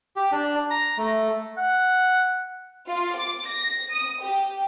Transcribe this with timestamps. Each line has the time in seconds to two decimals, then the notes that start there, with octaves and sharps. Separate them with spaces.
0.16 G4
0.32 D4
0.70 A#5
0.98 A3
1.57 F#5
2.86 F4
3.17 D6
3.48 A#6
3.91 D#6
4.21 G4